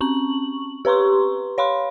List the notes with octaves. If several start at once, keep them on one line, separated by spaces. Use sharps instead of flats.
C4 C#4 C#6 F#7
G4 B4 A#5 C6 C#6
C#5 F5 B5 C6